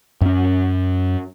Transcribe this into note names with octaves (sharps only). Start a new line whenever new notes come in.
F#2 C#4